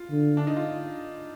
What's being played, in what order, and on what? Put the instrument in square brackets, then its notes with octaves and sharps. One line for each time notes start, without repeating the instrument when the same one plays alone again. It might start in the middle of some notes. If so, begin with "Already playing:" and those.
Already playing: [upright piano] F4
[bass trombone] D3
[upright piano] D4
D#4
F4